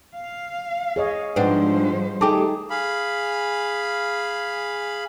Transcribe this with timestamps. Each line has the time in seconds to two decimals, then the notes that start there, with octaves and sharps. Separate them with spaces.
0.14 F5
0.96 G#4 C#5 D#5
1.36 G#2 F3 G3 C4 D4 B4 C5 F#5
2.21 A3 D#4 G4 G#4 A5 D6
2.70 G#4 F5 B5